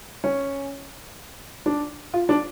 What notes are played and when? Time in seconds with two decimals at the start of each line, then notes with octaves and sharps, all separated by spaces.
0.24 C#4
1.66 D4
2.14 F4
2.29 D4